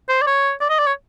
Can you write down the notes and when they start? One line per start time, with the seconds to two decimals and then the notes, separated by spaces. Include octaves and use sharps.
0.09 C5
0.21 D5
0.27 C#5
0.61 D5
0.69 D#5
0.79 D5
0.86 C#5